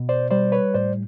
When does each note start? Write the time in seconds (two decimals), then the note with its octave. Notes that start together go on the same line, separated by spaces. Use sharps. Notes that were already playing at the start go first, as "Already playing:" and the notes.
Already playing: B2
0.09 C5 D5
0.30 G3 C5 D5
0.52 B4 C#5
0.74 A2 C5 D5